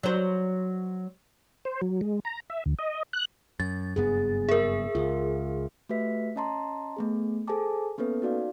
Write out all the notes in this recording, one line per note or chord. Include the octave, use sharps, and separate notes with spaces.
F#3 C5
C5
F#3
G#3
A#5
E5
D2
D#5
F#6
F#2 A6
F#1 G2 B3 G#4
G#4 A#4 E5
C#2 F4
A3 F#4 G4 B4 E5 B6
C#4 D#5 A5 A#5 C6
A3 B3 G#4
G#4 A4 C5 G#5 A5 D6
A#3 B3 C#4 A4 B4
D#4 F#4 D5 F5